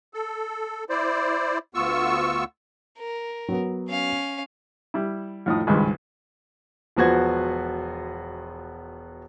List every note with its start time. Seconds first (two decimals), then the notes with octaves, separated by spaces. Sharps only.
0.14 A4
0.89 E4 C5 D5
1.74 D2 B3 F4 C#6 E6
2.98 A#4
3.48 F#3 B3
3.88 C#4 F5
4.94 G3 E4
5.46 F2 A2 D#4 D#6
5.67 G#1 C#2 G2 D#3 G#4
6.97 E1 F3 B3 F#4 C5 G#6